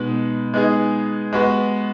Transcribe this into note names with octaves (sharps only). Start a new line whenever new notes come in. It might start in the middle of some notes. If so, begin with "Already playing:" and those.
Already playing: B2 G#3 D#4 B4
G#3 B3 D#4 G#4
G#3 B3 F#4 B4